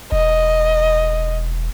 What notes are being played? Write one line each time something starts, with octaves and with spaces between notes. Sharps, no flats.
E1 D#5